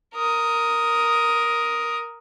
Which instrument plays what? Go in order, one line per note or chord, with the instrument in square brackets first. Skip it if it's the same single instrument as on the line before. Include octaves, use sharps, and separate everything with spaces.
[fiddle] A#4 D#6